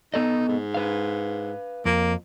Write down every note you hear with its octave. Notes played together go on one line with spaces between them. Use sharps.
B3 D#4 A4 D#5
G#2
B4 F5
F2 A#3